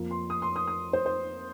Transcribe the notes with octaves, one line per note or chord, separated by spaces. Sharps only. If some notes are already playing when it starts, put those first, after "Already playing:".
Already playing: F2 F3 A#3
C6
D#6
C6
D#6
D#6
C5
C5